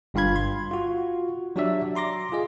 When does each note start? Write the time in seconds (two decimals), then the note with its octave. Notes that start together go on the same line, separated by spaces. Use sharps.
0.14 G1 G2 F4 F5 B5 G#6
0.36 C6
0.71 F4 F#4
1.56 F#3 D4 F#4 G4 D5 E5
1.95 A#5 C6 D6 A#6
2.32 F4 G#4 D#5